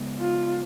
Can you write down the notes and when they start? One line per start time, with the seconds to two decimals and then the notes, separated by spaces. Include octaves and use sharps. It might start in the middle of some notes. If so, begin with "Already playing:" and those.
Already playing: C#3 G#3 B3
0.20 F4